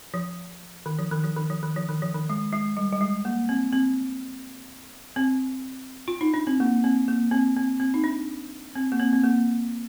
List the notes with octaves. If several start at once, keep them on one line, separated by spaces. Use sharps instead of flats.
F3
D#3
F3
D#3
F3
D#3
F3
D#3
F3
D#3
F3
D#3
G#3
G#3
G3
G3
G#3
A#3
C4
C4
C4
F4
D#4
D4
C4
A#3
C4
A#3
C4
C4
C4
D#4
D4
C4
A#3
C4
C4
A#3